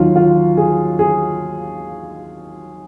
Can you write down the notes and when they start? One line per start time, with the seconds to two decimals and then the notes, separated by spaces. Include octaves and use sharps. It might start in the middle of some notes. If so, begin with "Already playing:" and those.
Already playing: D#2 D#3 F#3 F4
0.15 F4
0.57 G#4
0.99 G#4